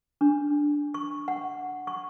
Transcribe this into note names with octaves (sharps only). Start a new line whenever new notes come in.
D4
C#6
F#5
C#6